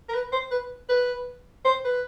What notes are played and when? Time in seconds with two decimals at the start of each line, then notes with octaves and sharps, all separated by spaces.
0.09 A#4
0.14 B4
0.32 C5
0.51 B4
0.89 B4
1.65 C5
1.85 B4